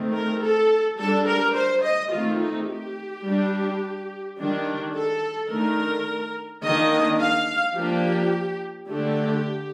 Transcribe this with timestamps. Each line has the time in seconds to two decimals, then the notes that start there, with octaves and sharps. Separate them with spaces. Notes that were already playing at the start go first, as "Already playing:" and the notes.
Already playing: D#3 A3 C4
0.14 A#4
0.42 A4
0.99 G3 D4 A4
1.27 A#4
1.55 C5
1.84 D#5
2.12 D#3 A3 C4 F4
2.40 D#4
2.69 G4
3.24 G3 D4
4.38 D#3 G3 D4
4.95 A4
5.50 D#3 A3 D4 A#4
6.63 D#3 A#3 D4 D#5
7.20 F5
7.76 F3 A#3 D4 G4
8.89 D3 A3 D4 G4